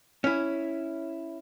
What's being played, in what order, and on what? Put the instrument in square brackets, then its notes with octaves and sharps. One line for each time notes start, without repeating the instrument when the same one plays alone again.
[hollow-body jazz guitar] C#4 E4